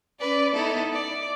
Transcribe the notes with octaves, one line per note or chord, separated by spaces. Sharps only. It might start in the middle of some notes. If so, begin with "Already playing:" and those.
C#4 B4 D5
B3 D#4 E4 A4
D5